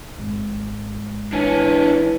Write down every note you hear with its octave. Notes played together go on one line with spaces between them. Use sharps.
G#1 G#2
E3 D4 C#5 G#5